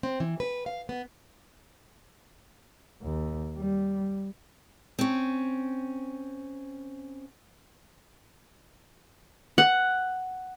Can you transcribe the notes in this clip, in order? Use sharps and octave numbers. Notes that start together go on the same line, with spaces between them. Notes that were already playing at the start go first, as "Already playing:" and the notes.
C4
E3
B4
F5
B3
D#2
G3
C4 C#4
F#5